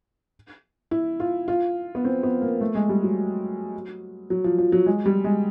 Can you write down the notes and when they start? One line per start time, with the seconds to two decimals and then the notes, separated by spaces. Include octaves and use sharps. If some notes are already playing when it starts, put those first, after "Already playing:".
0.91 E4
1.20 F4
1.48 F4
1.95 B3
2.05 C4
2.23 B3
2.42 A#3
2.61 A3
2.75 G#3
2.89 G3
3.03 F#3
4.30 F#3
4.44 F3
4.58 F3
4.72 F#3
4.86 G#3
5.06 G3
5.24 G#3